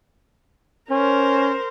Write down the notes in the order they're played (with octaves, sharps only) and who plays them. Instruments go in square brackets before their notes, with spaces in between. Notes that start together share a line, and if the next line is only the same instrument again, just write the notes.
[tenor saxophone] C#4 [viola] A#4 C5